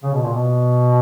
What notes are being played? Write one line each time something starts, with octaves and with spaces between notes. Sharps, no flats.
C#3
B2
A#2
B2